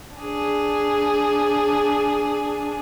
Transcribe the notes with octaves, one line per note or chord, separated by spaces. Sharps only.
D4 G#4